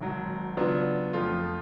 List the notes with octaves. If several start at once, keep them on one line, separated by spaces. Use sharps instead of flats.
G#1 G#2 F#3
C#3 F#3 B3 D4 F4
F2 F3 A3 F4